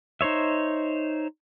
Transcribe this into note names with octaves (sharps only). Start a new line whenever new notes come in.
D#4 C5 C#5 E5